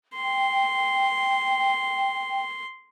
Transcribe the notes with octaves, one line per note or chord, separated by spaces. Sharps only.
G5 C6